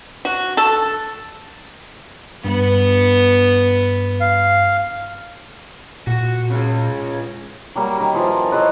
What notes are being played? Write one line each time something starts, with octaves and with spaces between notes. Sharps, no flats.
F#4
A4
G2 B3
F5
A#2 F#4
C#3 G#3
F#3 G3 A#3
D#3 A#4
E3 F3
A#4
B4 C#5 D#5 E5